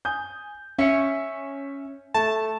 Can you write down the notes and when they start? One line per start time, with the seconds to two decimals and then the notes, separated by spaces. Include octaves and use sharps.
0.05 G#5 D#6 G6
0.79 C#4 E5 C#7
2.14 A3 A5